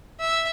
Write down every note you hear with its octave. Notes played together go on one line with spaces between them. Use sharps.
E5